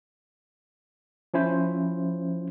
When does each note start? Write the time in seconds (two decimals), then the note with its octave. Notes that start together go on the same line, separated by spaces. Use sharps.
1.34 F3 C#4 E4 C5